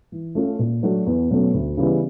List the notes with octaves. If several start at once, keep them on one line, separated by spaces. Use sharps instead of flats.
E3
A3 C#4 F4 A4
A#2
F#3 A3 D4 F#4
E2
B2 F#3 A3 C#4
D2
C#3 E3 G3 B3